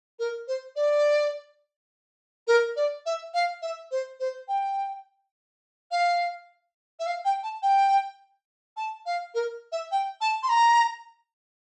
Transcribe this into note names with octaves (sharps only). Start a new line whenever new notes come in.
A#4
C5
D5
A#4
D5
E5
F5
E5
C5
C5
G5
F5
E5
F5
G5
A5
G5
A5
F5
A#4
E5
G5
A5
C6
A#5